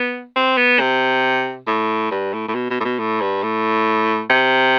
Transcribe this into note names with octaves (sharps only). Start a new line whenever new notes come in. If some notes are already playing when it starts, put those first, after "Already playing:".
Already playing: B3
C4
B3
C3
A2
G2
A2
A2
B2
B2
A2
B2
A2
G2
A2
C3